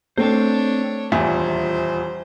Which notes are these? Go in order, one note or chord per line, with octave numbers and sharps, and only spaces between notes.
A3 C4 D4 C5 C#5
D#1 E2 E4 F4 C5 E5